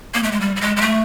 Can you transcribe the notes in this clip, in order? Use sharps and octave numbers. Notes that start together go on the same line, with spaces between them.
A#3
A3
G#3
G3
G3
G#3
G#3
A3